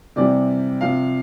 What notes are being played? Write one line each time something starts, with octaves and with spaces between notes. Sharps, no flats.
C3 E3 G3 D5
C3 F3 F5